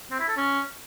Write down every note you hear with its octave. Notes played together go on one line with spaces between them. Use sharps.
C4
E4
A4
C#4